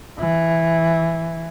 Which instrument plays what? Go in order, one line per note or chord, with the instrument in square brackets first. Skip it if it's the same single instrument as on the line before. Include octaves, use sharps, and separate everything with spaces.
[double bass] E3